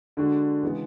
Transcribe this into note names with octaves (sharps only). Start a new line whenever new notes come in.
D3 G#3 D4 F#4
C#3 E3 G#3 B3